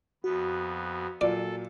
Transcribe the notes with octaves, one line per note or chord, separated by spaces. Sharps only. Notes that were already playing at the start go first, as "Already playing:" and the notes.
F2 B3 F#4
A#2 F#3 F4 A4 D5